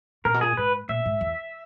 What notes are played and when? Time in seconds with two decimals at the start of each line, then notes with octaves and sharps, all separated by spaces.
0.25 A#2 A#4
0.34 B2
0.41 A#2 G#4
0.57 G#2 B4
0.89 A#2 E5
1.06 G#2
1.21 E2